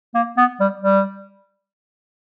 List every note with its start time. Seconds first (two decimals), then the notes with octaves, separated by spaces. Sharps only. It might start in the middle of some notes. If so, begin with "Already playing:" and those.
0.15 A#3
0.37 B3
0.60 G3
0.81 G3